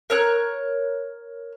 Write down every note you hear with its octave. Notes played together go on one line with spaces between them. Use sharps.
A#4 C#5 F#6